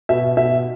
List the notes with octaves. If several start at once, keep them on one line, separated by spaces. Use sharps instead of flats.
B2 E5
B2 E5